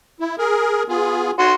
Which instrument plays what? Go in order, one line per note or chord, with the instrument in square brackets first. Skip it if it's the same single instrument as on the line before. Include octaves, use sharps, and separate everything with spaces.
[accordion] E4
G#4 A#4
B3 F4 G#4
[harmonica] F#4 C6 [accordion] C#5